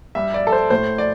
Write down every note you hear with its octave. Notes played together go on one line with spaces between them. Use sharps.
G2 G3 E5
D5
A4
C5
A2 A3 C5
D5